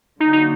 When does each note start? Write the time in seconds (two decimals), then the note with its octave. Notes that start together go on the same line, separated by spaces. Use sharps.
0.20 D3 F#3 A#3 D4 D#4 F#4
0.33 D#4